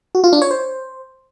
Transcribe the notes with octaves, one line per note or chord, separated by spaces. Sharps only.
F#4
F4
D4
C#5
C5